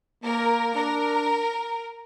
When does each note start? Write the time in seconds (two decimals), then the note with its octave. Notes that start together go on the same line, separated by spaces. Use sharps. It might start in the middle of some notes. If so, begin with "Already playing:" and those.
0.23 A#3 A#4
0.75 D4 A#4